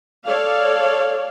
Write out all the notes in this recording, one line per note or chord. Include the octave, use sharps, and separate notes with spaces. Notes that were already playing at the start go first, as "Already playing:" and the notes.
A4 C#5 D5 F5